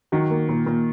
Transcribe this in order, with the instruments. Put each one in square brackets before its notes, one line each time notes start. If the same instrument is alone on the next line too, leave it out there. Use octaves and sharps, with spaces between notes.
[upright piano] D#3 [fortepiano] F#3
[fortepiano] A#3
A#2
A#2